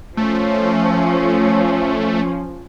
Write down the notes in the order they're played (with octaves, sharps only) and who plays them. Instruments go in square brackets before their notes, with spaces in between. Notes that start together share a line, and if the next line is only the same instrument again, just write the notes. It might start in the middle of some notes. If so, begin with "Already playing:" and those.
[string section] F3 C#4 [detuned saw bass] A3